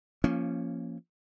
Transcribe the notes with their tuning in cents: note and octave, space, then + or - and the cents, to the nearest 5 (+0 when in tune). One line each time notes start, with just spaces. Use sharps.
F3 -20 A#3 +0 C#4 +0